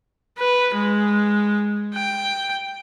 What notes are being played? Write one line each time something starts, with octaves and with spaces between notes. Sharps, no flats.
B4
G#3
G5